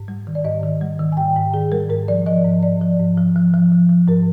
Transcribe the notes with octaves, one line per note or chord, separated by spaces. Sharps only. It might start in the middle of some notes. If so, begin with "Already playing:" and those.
Already playing: G#2
G3
D#3
D5
G#2 D#5
D#3
G3
D#3
G#5
G#2 G5
G#2
D#3 G#4
G3 A#4
G#2 A#4
F3 D5
F3 D#5
G#2
G#2 D5
F3
G#2
F3
F3
F3
F3
F3
G#2 A#4